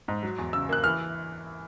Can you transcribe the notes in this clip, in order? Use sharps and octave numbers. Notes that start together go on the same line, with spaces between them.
G#2
F#3
E2
C#3 E6
A#3 F#6
E3 F6